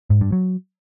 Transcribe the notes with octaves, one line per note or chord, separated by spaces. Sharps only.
G#2
G2
F#3